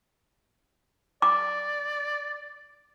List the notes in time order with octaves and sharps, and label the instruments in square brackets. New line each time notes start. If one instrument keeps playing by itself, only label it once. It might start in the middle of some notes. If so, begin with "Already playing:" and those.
[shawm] D5 [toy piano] D6